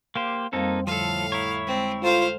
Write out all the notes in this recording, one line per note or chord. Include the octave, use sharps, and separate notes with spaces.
A#3 G4 C5 F5
F2 G3 A#3 C4 D#4 A4 F5
A2 D3 F3 A4 F5
E4 C#5 A#5
G#3 C4
F4 A4 C5 F5 G5 A#5